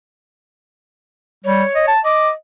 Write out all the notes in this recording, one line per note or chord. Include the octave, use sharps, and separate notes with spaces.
G3 C#5
D#5
A5
D#5 D6